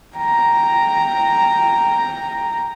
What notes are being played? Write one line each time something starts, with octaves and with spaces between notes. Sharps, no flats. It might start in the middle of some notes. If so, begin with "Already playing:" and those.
G5 A#5